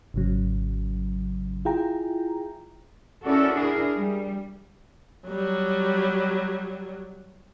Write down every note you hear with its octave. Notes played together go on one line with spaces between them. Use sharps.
G#1 C#3 F#3
E4 F4 G#4 G5 A#5
C#4 E4 F#4 A4 A#4 D5
D4 E4 G#4 A#4
G3
F#3 G3